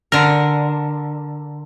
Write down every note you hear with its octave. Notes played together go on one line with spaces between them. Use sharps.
D3 A#4